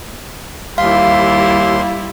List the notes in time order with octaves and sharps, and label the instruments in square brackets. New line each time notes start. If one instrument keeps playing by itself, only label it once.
[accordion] D#2 C6 [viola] G3 E4 [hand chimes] F5